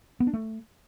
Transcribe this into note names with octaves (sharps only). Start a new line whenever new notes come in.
B3
D4
A3